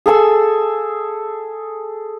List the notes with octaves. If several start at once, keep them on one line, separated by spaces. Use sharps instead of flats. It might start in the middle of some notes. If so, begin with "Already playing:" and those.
G#4 A4 G#5 E6